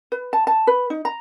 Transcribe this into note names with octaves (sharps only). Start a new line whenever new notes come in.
B4
A5
A5
B4
D#4
A#5